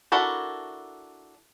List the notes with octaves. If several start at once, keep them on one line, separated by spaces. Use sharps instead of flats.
D4 E4 F#4 A4 A#4